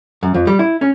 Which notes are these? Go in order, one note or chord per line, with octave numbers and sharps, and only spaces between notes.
F#2
F2
G3
E4
C#4